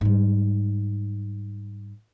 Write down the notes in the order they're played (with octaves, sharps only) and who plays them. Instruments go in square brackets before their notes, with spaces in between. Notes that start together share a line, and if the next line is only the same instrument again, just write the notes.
[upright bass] G#2 G3